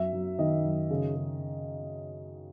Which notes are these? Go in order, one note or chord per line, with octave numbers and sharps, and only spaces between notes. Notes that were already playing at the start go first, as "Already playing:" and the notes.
Already playing: F#2 E5
F#2
D#3 D#5
F#2
C#3
C#3